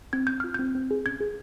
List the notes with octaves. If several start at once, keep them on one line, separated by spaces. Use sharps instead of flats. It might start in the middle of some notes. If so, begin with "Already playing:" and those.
C4 G#6
C4 G6
F4 F6
C4 G6
C4
G#4
C#4 G#6
G#4